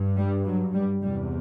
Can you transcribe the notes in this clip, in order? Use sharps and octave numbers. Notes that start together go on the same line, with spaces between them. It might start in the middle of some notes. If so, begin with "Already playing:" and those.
Already playing: G2
G3
F#3
G3
E2 C3 G3